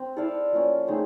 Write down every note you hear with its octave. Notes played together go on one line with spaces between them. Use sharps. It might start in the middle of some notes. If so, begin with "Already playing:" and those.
Already playing: C4
E4 A4 D5 F5
F3 A#3 C#4
A3 C4 D#4 G#4